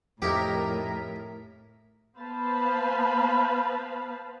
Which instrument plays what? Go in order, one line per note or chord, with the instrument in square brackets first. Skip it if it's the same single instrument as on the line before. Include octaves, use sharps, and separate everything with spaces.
[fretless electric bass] F2 [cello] A2 [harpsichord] D#4 E4 G4 [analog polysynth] A#4 B6
[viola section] B3 B4 C5 F5 A5 B5